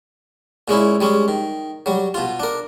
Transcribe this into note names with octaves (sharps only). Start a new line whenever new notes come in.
A#2 G#3 C#4 E4
G3 G#3 C#4
D#3
F#3 G3
B2 F4
D4 A#4